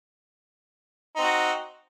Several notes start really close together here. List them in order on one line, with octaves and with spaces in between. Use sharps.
D#4 C4 F#4